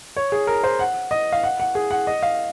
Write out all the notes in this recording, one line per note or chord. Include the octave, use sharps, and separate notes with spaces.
C#5
G#4
A#4
C5
F#5
D#5
F5
F#5
F#5
G#4
F#5
D#5
F5